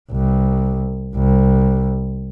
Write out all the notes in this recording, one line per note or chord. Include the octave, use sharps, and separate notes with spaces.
C2
C2